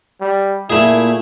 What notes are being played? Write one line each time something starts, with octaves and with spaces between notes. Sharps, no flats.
G3
A#2 A3 A#3 E4 G#4